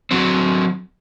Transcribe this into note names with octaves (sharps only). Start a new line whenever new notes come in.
F#3 C4